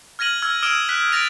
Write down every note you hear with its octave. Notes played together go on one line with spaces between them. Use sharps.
F6 G#6 A#6 D#7 F#7
E6 F6 G#6
D#6 F6 D7 E7 G7
F#6 B6 G7
A6 A#6 D7 F7